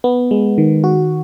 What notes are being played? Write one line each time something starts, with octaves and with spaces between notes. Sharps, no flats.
B3
G#3
D#3
F#4